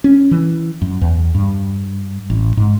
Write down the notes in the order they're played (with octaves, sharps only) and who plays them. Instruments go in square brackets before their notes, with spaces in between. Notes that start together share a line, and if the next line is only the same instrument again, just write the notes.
[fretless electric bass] C#4
E3
F#2
E2
G2
A1
G#2